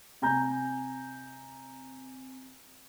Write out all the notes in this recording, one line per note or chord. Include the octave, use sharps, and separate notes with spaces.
C3 G#5 A#5 G6